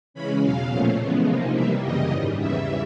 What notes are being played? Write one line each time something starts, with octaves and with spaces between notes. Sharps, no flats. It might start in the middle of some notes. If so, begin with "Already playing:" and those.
C#3 E3 G#3 C#4 B5
E2 B2 F#3 F5
A#2 F3 A3 C#4
C#3 E3 G#3 B3
C3 F3 A#3 D#4
C3 E3 G3 A#3 E5
F#2 C#3 E3 G3 D#5
G#2 D#3 G3
E2 C#3 E3 G3 E5